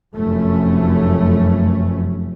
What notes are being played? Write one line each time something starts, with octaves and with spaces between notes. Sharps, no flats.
F1 F#2 A3 C#4